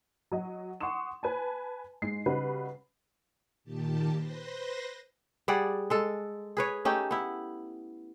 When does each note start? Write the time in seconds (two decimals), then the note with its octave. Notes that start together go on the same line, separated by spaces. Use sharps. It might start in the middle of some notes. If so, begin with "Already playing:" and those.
0.32 F#3 D#5 F#5
0.81 F#5 C6 C#6 D#6 E7
1.23 B4 G#5 A5
2.02 G#2 G#3 C7
2.26 C#3 G3 D#4 F#4 B4
3.64 A#2 D#3 G4 A5
4.15 B4 C5 C6 A#6
5.48 G3 G#4 D5 F#5
5.90 G#3 A4
6.57 G#4 B4 C#5
6.85 A3 C#4 D#4 G4
7.11 B3 E4